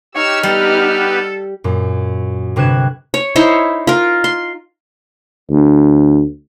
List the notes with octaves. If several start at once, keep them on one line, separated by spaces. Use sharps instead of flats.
D#4 G4 C#5 E6 F6
G3 B3 G4 A4 B4
F#2 A#2
G1 C3 B4 F#6 G#6 E7
C#5
D#4 E4 C5 C#5
F4 A#4
C6
D2